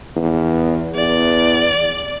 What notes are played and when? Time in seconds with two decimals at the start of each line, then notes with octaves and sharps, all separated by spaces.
0.16 E2
0.95 E2 D5